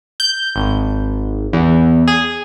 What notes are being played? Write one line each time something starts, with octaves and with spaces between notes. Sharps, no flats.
G6
G#1
E2
G#4